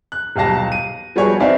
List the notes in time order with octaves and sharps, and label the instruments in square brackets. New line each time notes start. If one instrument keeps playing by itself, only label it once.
[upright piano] F#6
D#1 B1 G4 F5 A5 A#6
D#7
F3 G3 B3 F#4 G#4 C#5
C4 D#4 B4 D5 E5 F5